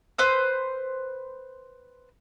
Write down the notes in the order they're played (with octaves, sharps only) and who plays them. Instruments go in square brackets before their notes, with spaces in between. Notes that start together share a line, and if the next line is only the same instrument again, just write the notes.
[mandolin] B4 C5 E6